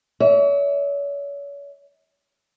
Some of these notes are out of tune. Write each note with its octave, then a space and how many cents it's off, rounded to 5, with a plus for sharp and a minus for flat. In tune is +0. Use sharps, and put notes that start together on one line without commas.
C#5 +40 E5 -35